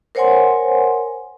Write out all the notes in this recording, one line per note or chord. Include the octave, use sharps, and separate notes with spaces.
A#4 C5 C#5 F#5 G#5 C6